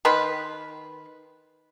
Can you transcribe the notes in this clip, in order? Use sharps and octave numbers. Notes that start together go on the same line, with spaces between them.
D#3 B4 C6